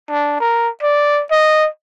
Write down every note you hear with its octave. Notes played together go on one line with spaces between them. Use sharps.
D4
A#4
D5
D#5